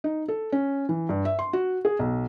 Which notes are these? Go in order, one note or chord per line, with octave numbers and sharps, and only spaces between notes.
D#4
A4
C#4
E3
G2
E5
C6
F#4
G#4
B1